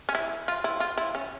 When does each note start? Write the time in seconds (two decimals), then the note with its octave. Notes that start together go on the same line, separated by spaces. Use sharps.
0.09 C#4
0.15 E4
0.48 F4
0.64 E4
0.80 F4
0.98 E4
1.15 C#4